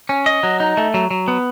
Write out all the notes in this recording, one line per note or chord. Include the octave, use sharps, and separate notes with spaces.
C#4
D#5
F#3
D#4
A3
F#3
F#3
B3